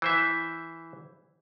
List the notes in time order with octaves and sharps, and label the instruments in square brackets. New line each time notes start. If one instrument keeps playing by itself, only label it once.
[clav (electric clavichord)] E3 C5 E5